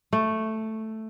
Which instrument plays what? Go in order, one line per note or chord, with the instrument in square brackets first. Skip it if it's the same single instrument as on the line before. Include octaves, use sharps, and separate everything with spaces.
[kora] A3